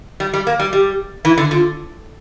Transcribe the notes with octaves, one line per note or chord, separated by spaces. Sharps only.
G3
G3
A#3
G3
G3 G4
E3 E4
D3
D3 F4